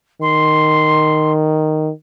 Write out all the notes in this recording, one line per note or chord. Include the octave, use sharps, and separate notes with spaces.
D#3 C6